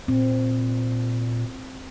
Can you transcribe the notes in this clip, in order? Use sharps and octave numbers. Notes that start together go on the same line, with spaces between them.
A#2 C4